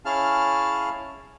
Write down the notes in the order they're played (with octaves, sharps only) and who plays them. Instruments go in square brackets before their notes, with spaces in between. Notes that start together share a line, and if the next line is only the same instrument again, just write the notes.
[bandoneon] C#4 E4 G#4 F5 A5 F6